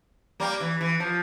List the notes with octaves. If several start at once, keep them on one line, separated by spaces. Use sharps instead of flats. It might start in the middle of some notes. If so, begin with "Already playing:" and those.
G3 A#3
E3
E3
F3